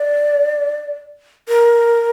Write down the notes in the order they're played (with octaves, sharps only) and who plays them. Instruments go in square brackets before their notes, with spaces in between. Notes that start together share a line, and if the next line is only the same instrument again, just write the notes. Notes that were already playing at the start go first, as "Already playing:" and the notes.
Already playing: [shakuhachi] D5
A#4